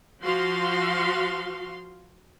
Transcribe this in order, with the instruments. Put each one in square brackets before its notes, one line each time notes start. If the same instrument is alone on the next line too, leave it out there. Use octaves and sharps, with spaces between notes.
[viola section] F3 F#4 F5 C6